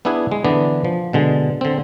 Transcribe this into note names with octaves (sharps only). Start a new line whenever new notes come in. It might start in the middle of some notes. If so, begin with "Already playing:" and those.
B3 D4 E4 G#4 B4 G#5
G#3
D3 E3 B3 D4
F3
B2 D3 G#3
D3 C4